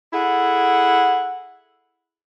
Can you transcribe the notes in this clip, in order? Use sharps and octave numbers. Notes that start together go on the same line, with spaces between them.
E4 G#4 A4 F#5